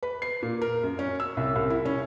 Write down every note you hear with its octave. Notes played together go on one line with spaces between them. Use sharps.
B4
C7
A#2
A#4
F#2
C#4
E6
C2
C2
E4
C#4